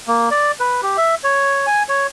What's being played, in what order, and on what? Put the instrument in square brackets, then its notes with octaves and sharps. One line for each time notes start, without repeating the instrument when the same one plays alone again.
[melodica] A#3
D5
B4
G4
E5
C#5
G#5
C#5